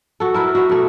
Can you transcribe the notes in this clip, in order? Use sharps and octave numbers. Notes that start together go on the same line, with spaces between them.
F#4 A4
E4 A#4 B4
F#4 B4
B2 A3